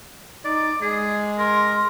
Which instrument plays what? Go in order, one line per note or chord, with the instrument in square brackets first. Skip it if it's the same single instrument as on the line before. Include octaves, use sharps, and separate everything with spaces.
[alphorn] D#4 [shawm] D5
[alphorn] G#3 [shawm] G#4
[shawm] A#4 [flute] C6